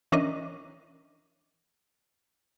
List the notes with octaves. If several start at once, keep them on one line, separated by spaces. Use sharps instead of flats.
E3 C#4 D4 A#4 D#5